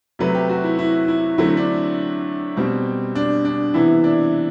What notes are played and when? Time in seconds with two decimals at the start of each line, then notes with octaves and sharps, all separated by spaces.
0.19 C3 F#3 A3 B4
0.35 G4
0.49 F#4
0.63 E4
0.79 E4
1.08 E4
1.38 D3 F#3 A3 C4 E4
1.57 D4
2.56 B2 G3 C4
3.15 D4
3.45 D4
3.74 C3 E3 B3 E4
4.04 D4